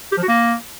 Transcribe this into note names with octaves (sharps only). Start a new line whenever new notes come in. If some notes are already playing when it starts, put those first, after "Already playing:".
G4
F3
F#4
A#3